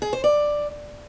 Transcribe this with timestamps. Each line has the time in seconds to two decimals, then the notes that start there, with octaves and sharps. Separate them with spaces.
0.02 G#4
0.13 C5
0.24 D5